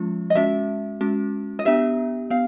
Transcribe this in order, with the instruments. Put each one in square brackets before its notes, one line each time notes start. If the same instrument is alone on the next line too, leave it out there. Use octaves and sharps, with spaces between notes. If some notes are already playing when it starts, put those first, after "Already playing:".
Already playing: [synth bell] F3 G#3 C#4 F4
[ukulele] D#5
[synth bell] G#3 C#4 F#4 [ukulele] E5
[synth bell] G#3 C#4 F#4
[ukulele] D#5
[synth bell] B3 D4 G4 [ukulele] E5
[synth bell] B3 [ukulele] F5